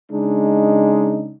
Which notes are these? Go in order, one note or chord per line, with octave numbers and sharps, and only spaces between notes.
C#3 G#3 D4 D#4